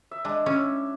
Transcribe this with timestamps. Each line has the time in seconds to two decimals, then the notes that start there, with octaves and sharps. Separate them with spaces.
0.11 E5
0.25 G#3 D4
0.46 C#4 E4